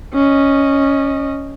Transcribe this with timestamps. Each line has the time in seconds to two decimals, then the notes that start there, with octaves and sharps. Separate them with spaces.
0.14 C#4 D#5